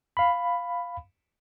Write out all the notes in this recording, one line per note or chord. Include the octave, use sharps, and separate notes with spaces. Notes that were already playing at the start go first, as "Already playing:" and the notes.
F5 B5